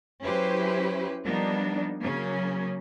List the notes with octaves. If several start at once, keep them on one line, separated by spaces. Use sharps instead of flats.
F#3 C#4 E4 G4 B4 C5
F3 G3 A#3 B3 D4 D#4
C#3 F#3 A#3 C#4